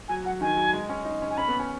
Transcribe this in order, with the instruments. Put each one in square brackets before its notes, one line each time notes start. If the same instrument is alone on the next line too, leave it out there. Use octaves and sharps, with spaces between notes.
[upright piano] F#3 [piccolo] G#5
[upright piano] F#3 [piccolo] F#5
[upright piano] D#3 [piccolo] G#5
[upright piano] F#3
G#3
C#4
D#4
C#4
[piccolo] G#5
[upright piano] C#4 [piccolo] B5
[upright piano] B3
C#4